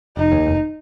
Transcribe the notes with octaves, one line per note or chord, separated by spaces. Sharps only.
F1 D#4
D#2
F1